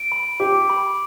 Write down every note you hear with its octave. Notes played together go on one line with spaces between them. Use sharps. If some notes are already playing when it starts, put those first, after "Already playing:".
Already playing: D7
B5
G4 D6
B5